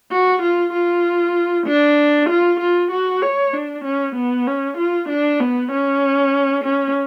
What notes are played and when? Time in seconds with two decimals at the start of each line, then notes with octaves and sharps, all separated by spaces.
0.11 F#4
0.42 F4
0.73 F4
1.67 D4
2.29 F4
2.60 F4
2.91 F#4
3.22 C#5
3.53 D4
3.84 C#4
4.16 B3
4.47 C#4
4.77 F4
5.09 D4
5.40 B3
5.72 C#4
6.64 C#4